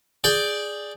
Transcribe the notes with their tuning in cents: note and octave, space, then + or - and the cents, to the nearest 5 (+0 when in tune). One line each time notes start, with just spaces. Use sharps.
G#4 +0 D5 +0 G5 +0